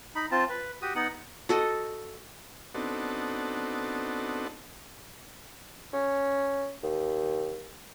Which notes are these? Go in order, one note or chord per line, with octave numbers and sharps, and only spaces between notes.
D#4 B5
C4 F4 A5
B4
F#4 G4 D#6
B3 D#4 F#5
F#4 A4 D#5
B3 C4 D4 D#4 F#4 A4
C#4
D#2